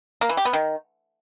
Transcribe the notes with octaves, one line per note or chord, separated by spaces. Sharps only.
A#3
E3
G4
B3
D#3